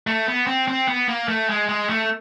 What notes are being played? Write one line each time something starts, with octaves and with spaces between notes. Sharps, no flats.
A3
B3
C4
C4
B3
A#3
A3
G#3
G#3
A3